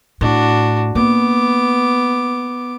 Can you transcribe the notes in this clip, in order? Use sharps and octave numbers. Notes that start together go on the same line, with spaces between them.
A2 D4 F#4
A#3 B3 D6